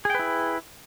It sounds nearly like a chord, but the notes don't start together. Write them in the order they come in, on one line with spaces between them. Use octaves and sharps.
G#4 G5 B4 E4